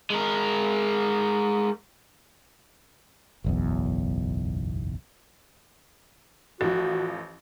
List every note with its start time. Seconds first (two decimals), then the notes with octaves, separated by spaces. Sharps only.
0.10 G#3 A#4
3.44 F#1 B1 E2
6.61 A1 F3 F#4